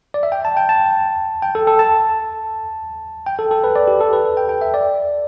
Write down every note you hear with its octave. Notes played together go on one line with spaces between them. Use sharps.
D5
E5
G5
A5
G5
A5
G5
A4
A4
A5
G5
A4
A4
B4
D5
G4
A4
B4
G5
G5
E5
D5